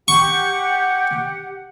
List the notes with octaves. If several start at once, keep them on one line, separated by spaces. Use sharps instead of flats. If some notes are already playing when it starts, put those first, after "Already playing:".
G4 F#5 C#6